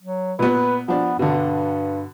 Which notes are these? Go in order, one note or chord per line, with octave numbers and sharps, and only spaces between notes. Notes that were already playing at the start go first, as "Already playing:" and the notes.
F#3
A#2 B3 B4
F3 B3 D4
G2 B2 D3